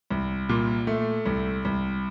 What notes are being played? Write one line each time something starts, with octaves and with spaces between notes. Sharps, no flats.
C2
A#2
A3
C2
C2